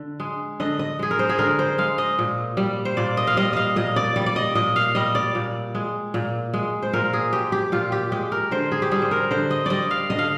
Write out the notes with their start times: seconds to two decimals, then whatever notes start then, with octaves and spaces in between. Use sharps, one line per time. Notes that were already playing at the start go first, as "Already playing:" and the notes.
Already playing: D3
0.20 G#3
0.60 D3 D#5
0.79 D#5
0.99 G#3 G#4
1.11 A#4
1.19 C5
1.29 G#4
1.39 D3 A#4
1.59 C5
1.78 G#3 F5
1.98 D#5
2.19 A#2
2.57 G3
2.85 C5
2.97 A#2 D5
3.17 D#5
3.27 F5
3.37 G3 D#5
3.53 D#5 F5
3.76 A#2 D#5
3.96 D5
4.16 G3 D5
4.26 D5
4.36 D#5
4.55 A#2 D#5
4.76 F5
4.95 G3 D#5
5.15 D5
5.35 A#2
5.75 G#3
6.14 A#2
6.54 G#3
6.82 C5
6.93 A#2 A#4
7.13 G#4
7.32 G#3 G4
7.52 G4
7.72 A#2 F4
7.92 G4
8.12 G#3 G4
8.32 A#4
8.51 D3 C5
8.72 G#4
8.82 G4
8.91 G3 G#4
9.02 C5
9.11 A#4
9.31 D3 C5
9.51 D#5
9.66 G3 D5 D#5
9.91 F5
10.10 D3 D#5
10.19 F5